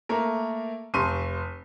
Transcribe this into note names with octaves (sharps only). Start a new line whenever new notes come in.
A3 A#3 A#4
F1 C6 C#6 D#7